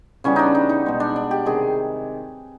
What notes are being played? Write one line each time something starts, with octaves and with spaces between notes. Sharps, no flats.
C#3 E3 G3 B3 C#4
D4 D#4
D#4
D#4
B2 G#3 B3
D4
D4
G4
C3 D#3 G#3 G#4